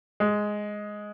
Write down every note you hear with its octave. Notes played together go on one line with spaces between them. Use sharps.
G#3